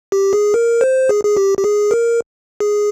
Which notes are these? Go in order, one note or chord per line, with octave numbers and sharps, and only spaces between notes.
G4
G#4
A#4
C5
G#4
G#4
G4
G4
G#4
A#4
G#4